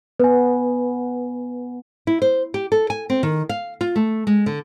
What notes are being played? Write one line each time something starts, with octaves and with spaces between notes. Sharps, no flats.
B3 B4 G#5
E4
C5
G4
A4
G#5
C4
D#3
F5
F4
A3
G#3
D3